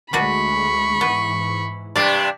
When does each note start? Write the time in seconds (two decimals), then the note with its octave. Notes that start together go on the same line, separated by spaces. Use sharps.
0.13 D2 G#3 D4 F#4 B4 B5 C#6
1.01 G#2 E3 B3
1.96 G2 C3 D4 D5 F5